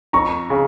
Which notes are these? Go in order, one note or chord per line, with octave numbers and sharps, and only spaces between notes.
F2 A#5 C#6
C#3